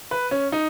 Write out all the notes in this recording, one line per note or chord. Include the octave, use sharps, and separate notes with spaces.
B4
C#4
D#4